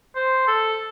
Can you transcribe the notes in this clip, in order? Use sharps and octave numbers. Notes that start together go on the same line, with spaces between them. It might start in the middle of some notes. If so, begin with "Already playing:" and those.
C5
A4